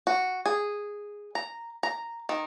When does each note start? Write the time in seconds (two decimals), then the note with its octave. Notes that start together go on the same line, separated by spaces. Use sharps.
0.07 F#4
0.46 G#4
1.35 A#5
1.83 A#5
2.29 D#3